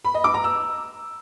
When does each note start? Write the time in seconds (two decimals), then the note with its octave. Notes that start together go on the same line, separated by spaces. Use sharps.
0.04 B5
0.14 D#5
0.24 D6
0.34 A#5
0.44 E6